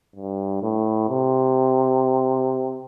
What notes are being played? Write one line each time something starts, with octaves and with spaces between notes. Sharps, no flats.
G2
A2
C3